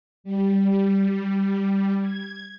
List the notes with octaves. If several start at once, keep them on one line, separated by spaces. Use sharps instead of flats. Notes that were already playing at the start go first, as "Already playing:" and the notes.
G3
G#6